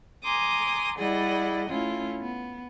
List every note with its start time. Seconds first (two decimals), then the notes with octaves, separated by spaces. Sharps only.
0.23 G#5 A#5 C6 D6 D#6
0.99 G3 E4 G#4 D5 D#5 F#5
1.68 A3 C#4 E4 F4
2.20 B3